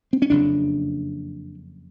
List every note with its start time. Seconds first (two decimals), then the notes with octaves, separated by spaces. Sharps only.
0.13 C4
0.22 C#4
0.30 F#1 F2 C#3 D4